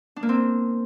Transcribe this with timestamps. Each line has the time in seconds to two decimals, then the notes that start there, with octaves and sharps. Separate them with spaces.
0.16 D4
0.23 A#3
0.29 C4